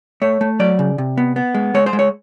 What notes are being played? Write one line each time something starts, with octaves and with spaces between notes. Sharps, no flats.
A3 C#5
A3
F#3 D5
C#3
C3
B3
B3
G#3
G#3 C#5
C5
G#3
C#5